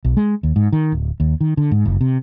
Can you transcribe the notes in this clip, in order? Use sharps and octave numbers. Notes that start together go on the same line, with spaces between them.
B1
G#3
D#2
G#2
D#3
D1
D#2
D#3
D3
G#2
F#1
C3